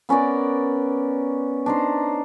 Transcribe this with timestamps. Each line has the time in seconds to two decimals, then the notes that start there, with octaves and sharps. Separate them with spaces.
0.09 B3 C#4 A#4 D5
1.66 D4 D#4 C5